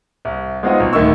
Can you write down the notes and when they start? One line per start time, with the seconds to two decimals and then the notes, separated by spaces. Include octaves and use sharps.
0.25 C2
0.63 G#3 B3 C4 D#4 F4 F#4
0.80 B1
0.93 D1 D2 D#3 A3 C#6 E6